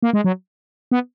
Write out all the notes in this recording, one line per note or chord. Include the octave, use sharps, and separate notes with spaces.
A#3
G#3
F#3
B3